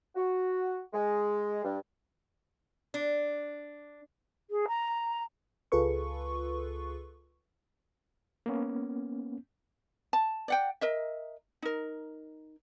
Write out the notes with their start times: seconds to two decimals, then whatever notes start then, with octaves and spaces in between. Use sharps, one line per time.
0.15 F#4
0.93 G#3
1.63 G2
2.94 D4
4.50 G#4
4.68 A#5
5.72 C#2 F4 G#4 A4 B4 C#6
8.46 A#3 B3 C#4
10.13 A5
10.48 D5 F#5 G5
10.81 A#4 D#5 E5
11.62 D#4 A#4